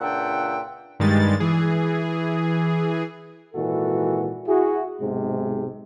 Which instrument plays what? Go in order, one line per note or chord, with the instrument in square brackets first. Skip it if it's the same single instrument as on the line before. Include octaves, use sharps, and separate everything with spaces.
[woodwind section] C#2 A#2 D4 E5 F#5 G5
[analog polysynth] G2 D#3 G3 G#3 A6
E3 G#4
[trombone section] G#1 A#2 E3 G#3 F#4 A4
E4 F#4 G#4
B1 G#2 C3 G#3